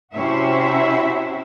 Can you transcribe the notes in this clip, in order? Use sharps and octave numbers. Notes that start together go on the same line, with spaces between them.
C3 C4 C#4 E4 F#4 E5